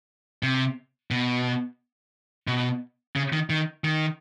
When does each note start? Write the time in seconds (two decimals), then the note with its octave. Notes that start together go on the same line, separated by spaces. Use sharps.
0.43 C3
1.11 B2
2.47 B2
3.16 C#3
3.33 D#3
3.50 D#3
3.84 D#3